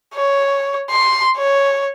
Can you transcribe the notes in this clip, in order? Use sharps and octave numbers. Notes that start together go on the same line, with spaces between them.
C#5
C6
C#5